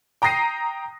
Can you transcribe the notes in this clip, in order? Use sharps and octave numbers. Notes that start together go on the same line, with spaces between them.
G5 A#5 D#6 A#6 C7 D#7